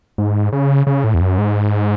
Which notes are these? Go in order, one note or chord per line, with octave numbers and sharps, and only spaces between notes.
G#2
C#3
C#3
A2
E2
F#2
G#2